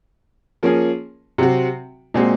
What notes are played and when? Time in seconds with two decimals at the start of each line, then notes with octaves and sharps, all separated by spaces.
0.63 F3 A#3 C#4 G#4
1.38 C3 F#3 C4 F#4
2.14 A#2 G#3 C4 F#4